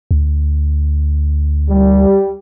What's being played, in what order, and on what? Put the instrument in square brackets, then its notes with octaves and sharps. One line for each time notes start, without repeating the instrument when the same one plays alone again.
[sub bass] D2
[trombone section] G3